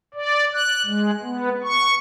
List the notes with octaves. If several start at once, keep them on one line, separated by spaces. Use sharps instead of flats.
D5
F#6
G#3
B3
C#6